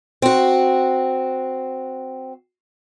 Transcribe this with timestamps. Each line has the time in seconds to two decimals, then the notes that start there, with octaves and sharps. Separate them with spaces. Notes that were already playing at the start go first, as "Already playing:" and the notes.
0.22 C4 F#4